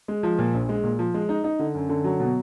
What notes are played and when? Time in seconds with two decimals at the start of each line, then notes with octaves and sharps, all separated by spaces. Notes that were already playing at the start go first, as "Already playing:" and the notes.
0.08 G#3
0.23 F3
0.39 A#2
0.54 A#1
0.69 G#3
0.84 A#2
0.99 F3
1.14 G#3
1.29 D#4
1.44 D#4
1.59 D3
1.74 F#2
1.89 D3
2.04 F#3
2.20 B2